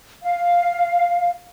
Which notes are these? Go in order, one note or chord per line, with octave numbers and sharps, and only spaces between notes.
F5